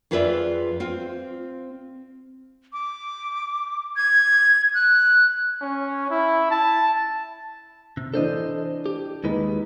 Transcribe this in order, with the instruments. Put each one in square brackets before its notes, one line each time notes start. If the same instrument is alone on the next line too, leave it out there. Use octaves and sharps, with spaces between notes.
[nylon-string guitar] F2 F4 G#4 B4 D5 E5
C4 F4
[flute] D6
G#6
F#6
[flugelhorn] C#4
E4
A5
[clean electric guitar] C3
[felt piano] E3 D4 [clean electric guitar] A4 C5 D#5
[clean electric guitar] G4
[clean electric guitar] D#2 G#3 B4 [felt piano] D#4